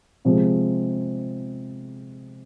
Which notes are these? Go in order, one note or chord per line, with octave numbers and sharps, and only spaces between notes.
C3 F3 G#3